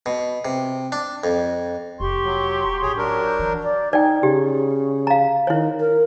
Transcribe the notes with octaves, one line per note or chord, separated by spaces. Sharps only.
B2
C3
D4
F2
F1 G4 C6 C#6
F#3
A1 G#4 C#5
F#3 D4 A#4
G6
E3
D5
D#4 D5 G5
C#3 G4
F5 A#5
D#3 E4 C#5
A#4